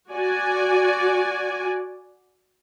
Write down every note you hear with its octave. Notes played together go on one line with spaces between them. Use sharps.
F#4 D5 G#5